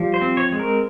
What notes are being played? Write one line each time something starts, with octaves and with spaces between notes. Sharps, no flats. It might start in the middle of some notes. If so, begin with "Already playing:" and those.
Already playing: F3 G3
C5
C4
C#5
G#3
A#4